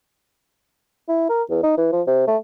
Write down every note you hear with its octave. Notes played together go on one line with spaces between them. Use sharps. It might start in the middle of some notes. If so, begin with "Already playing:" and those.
E4
A#4
E2
D#4
E3
F3
C3
A3